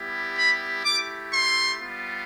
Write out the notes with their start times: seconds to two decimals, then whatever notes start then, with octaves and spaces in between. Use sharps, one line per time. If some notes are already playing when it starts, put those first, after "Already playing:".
Already playing: G3 B3 E4 G4
0.37 B5
0.84 A3 E4 G4 D6
1.32 C6
1.79 G3 B3 F4